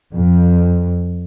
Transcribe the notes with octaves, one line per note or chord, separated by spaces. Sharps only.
F2